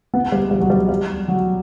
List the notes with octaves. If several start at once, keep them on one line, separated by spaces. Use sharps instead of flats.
B3
G3
G3
F#3
G3
G3
F#3